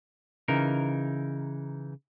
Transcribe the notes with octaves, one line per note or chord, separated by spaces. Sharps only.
C#3 E3 D#4 A#4